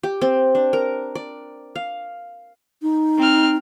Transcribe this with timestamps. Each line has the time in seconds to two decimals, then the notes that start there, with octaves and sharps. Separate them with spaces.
0.03 G4
0.21 C4
0.55 D4
0.73 A#4
1.15 D5
1.75 F5
2.82 D#4
3.18 C4 F6